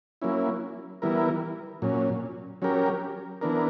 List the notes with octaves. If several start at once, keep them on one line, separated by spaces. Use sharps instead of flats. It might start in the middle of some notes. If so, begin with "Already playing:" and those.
F#3 A#3 C#4 E4
E3 G3 B3 E4 A#4
A#2 F#3 C#4
F#3 C#4 G4 A#4
E3 B3 D4 A#4